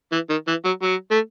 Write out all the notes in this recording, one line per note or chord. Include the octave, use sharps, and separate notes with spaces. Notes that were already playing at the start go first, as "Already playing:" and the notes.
E3
D#3
E3
F#3
F#3
A3